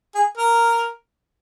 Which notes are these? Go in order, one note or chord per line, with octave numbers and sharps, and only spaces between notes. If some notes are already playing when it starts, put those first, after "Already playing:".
G#4
A#4